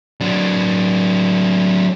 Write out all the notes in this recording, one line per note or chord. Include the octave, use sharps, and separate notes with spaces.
F#3 D4